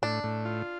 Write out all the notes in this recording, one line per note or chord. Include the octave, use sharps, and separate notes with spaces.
A2 D4
A2
F4